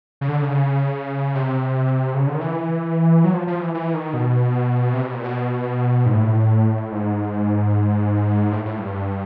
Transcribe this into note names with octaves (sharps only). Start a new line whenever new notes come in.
C#3
D3
C#3
C3
C#3
D3
D#3
E3
F#3
F3
F3
E3
E3
D#3
B2
C3
B2
A#2
B2
G#2
A2
G#2
A2
A2
G2